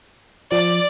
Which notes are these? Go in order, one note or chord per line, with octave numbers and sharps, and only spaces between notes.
F3 D5